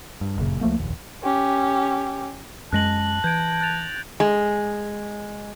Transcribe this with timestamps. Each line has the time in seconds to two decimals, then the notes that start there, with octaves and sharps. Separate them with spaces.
0.21 G2
0.37 G1 F#2 A#2 C#3
0.61 C#2 F3 A3 A#3
0.78 F1 A#1 D#2
1.23 C#4 G4
2.72 F#2 G#3 A5 F#6 A#6 F#7
3.24 E3 G6 G#6 D7
3.61 F#6 A6 F7
4.20 G#3